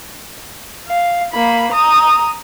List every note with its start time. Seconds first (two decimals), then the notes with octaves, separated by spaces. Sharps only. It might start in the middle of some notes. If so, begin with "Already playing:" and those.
0.88 F5
1.33 A#3 B5
1.72 A#5 D#6